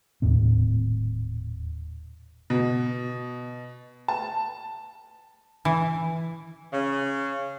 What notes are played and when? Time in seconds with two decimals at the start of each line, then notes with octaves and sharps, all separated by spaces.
0.22 D#1 A2 C4
2.50 B2
4.08 A5
5.65 E3
6.72 C#3